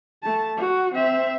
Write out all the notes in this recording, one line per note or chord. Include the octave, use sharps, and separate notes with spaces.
A3 A5
F#4
C4 E5